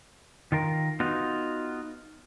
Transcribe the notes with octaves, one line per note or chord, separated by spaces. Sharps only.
D#3 F4 A#4
B3 D#4 F4 F#4